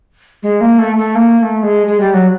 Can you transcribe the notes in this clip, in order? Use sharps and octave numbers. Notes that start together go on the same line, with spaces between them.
G#3
A#3
A3
A3
A#3
A#3
A3
G#3
G#3
G3
F#3